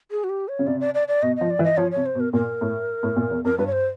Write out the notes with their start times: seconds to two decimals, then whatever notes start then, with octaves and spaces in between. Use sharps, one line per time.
0.11 G#4
0.24 F#4
0.29 G4
0.48 C#5
0.59 C#3
0.66 C3 D5
0.80 D5
0.94 D5
1.08 D5
1.22 B2 D#5
1.36 F3 D#5
1.50 D5
1.59 E3
1.64 D#5
1.77 F3 C#5
1.91 C3 C#5
2.06 C5
2.15 B2
2.20 A#4
2.33 A#2 A#4
2.61 A2
3.03 A2
3.16 A#2
3.30 E2
3.45 F2 A#4
3.58 G2 B4
3.67 C#5
3.72 C5